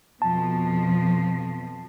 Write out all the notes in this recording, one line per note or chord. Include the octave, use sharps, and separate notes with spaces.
F2 B2 F3 A5